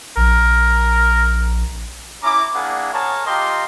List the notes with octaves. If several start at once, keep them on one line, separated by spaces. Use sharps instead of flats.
A#1 A#4
C#4 E4 A#5 D6
A#3 D4 E4 G#4 F#5
G#4 A#4 C#5 A5
F4 G4 D#5 A#5 C6